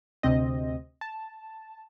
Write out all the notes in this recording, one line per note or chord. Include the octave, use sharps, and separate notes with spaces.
D2 C3 C4 D#5
A5